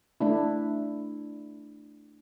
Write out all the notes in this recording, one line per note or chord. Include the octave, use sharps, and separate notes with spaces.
A3 D4 E4